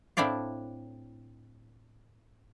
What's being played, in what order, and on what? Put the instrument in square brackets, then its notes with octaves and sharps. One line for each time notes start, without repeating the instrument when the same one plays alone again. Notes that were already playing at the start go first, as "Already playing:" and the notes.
[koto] A2 C4 D4 E4 D5 F5